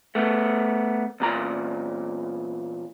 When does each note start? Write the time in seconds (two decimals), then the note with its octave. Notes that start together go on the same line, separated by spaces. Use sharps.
0.15 A3 B3
1.20 E2 A#2 A#5